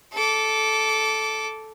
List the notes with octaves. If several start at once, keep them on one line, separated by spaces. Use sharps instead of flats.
A4 D6